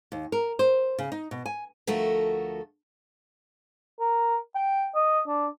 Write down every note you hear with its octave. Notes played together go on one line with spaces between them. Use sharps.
D#2
A#4
C5
C#3
D#4
B2
G#5
D2 F3 A3 F#4 A4 A#4
A#4
G5
D#5
D4